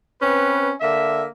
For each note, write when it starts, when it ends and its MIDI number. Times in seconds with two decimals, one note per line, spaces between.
0.20 0.70 60
0.20 0.70 61
0.20 0.70 71
0.80 1.25 50
0.80 1.25 58
0.80 1.25 76